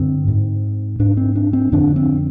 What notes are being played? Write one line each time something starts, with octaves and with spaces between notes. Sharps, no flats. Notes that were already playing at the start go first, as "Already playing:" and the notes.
Already playing: G2 D3 C4
G#2
G#2 D4
C4
D4
C4
F2 D3 D4
C4